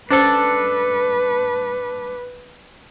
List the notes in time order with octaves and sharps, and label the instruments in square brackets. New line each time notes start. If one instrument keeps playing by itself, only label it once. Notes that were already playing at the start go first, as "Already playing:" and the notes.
[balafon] C#4 C5 [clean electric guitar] D4 A4 [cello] B4